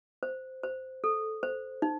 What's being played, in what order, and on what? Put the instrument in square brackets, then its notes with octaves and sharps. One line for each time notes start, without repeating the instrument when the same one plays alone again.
[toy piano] C5
C5
A4
C5
D#4